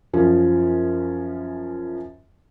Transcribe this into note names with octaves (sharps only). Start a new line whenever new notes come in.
F#2 F3 C#4